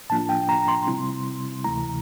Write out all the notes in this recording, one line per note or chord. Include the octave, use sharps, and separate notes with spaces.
A2 F3 A#3 D4 F4 A5
G5
A#5
C6
C3 G3 C4 E4
D2 C3 E3 A3 E4 A#5